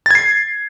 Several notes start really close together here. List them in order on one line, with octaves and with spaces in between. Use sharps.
A6 G#6 C7